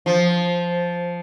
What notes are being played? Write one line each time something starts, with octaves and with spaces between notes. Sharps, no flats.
F3